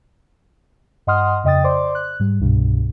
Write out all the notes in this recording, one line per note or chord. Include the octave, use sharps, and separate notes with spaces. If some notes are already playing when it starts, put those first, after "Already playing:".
G2 D#5 F#5 C6 D#6 F6
F2 C#3 D#5 G5 D#6 A6
C5 D5 C6 D6
F#6
G#2 G3
C2 G2 B2